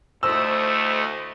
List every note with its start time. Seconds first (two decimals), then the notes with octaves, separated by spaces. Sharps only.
0.23 D2 A3 E4 C5 D#5 E6